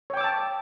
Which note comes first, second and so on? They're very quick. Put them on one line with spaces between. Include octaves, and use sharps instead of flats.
C#5 G5 D6 E6 A5